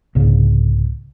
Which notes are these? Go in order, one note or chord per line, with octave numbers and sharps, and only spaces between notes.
C2 G#2 C#3 A#3